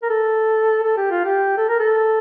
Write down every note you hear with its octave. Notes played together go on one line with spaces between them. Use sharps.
A#4
A4
A4
G4
F4
G4
A4
A#4
A4